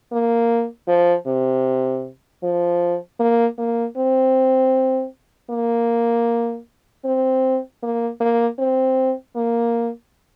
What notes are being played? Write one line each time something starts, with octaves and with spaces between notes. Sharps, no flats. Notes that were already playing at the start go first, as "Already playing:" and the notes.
A#3
F3
C3
F3
A#3
A#3
C4
A#3
C4
A#3
A#3
C4
A#3